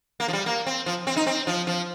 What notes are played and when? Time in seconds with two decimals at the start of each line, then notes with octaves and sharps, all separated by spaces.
0.20 A#3
0.28 F3
0.33 G3
0.46 A#3
0.66 C4
0.86 F3
1.07 C4
1.17 D#4
1.27 C4
1.47 F3
1.67 F3